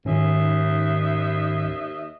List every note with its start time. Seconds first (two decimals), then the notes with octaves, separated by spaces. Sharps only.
0.05 D#2 G#2 D#3 C#4 D#5 E5